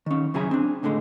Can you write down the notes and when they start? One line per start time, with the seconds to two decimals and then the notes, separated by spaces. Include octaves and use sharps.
0.06 D#3 C#4
0.34 F#2 C#3 E4 G#4 A#5
0.51 C4 D4
0.83 C#2 A2 D3 G#3